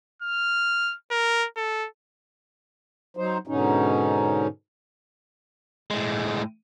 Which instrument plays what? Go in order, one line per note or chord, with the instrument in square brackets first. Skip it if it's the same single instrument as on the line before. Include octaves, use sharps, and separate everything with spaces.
[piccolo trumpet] F6
A#4
A4
[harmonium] F#3 D#4 C5
G#2 B2 D3 C#4 D#4
[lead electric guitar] A2 G#3